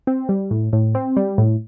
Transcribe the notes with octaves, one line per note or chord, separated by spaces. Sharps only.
C4
G3
A2
A2
C4
G3
A2